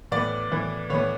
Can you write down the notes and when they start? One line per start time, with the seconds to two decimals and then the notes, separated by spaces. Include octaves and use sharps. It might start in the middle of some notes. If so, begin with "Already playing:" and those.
0.12 A2 E3 B3 D5
0.50 A2 E3 B3
0.90 A2 E3 B3 C#5